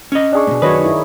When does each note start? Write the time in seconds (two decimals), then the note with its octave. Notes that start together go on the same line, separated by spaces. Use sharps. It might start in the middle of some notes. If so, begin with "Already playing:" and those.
0.12 C#4 D#5
0.32 D4 G#4 C#6
0.47 G#2 B2
0.62 F#2 D#3 F#4 B4 C#5 D#5
0.81 D#4 E4